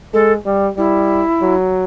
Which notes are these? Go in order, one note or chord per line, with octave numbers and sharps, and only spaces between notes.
G#3 A4
G3
G3 E4
F#3